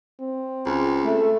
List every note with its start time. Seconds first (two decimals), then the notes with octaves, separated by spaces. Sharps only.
0.20 C4
0.66 C#2
1.04 A3